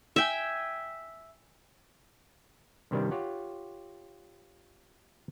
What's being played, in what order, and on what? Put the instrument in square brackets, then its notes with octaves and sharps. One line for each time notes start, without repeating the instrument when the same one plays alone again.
[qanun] E5 G5 G#5
[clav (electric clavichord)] G2 C3 D#3 G3 D4 E4
F4 G4 C#5 F#5